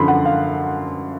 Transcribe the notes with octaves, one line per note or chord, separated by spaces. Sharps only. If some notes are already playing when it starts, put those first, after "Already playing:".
Already playing: F#2 D3 F3 B5 C6
F#5
F5